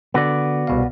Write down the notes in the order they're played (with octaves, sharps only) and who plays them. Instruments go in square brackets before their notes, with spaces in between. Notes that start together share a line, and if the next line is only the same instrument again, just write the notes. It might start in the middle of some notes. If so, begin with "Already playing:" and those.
[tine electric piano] D3 [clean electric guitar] B3 F#4 D5
[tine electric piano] C2 B2 F5